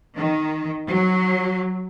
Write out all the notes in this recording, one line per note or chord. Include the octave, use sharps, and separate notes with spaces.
D#3
F#3